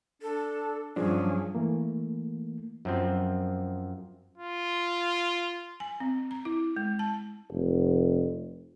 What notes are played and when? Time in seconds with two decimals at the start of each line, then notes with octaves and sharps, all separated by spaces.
0.22 D4 A4
0.96 G2 F3 F#3 C#4 D4 G#4
1.55 E3 A3 A#3
2.85 F#2 F3 C4
4.38 F4
5.80 G#5
6.00 C4
6.31 A#5
6.45 E4
6.76 G#3
6.99 A5
7.51 F1